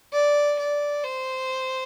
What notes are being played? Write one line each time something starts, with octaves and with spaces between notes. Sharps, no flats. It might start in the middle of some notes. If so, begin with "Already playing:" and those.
D5
D5
C5